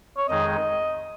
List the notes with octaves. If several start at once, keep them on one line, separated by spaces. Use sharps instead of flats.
C#5
F2 D#3 G#3 D#4 G#4 D#5